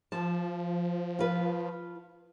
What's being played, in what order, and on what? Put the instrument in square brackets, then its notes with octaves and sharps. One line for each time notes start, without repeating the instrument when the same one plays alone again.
[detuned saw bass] F3 [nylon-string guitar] A5
[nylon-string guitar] F4 B4